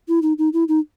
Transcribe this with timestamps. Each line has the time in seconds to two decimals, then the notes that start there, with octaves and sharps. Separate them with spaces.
0.08 E4
0.22 D#4
0.38 D#4
0.53 E4
0.68 D#4